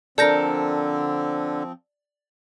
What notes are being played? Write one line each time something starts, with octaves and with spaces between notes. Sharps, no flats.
D3 F3 C4 A4 A#4 D5 G6 A#6